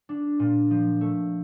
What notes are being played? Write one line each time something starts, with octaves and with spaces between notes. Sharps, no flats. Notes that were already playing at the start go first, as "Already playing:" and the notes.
D4
A#2
F3
A3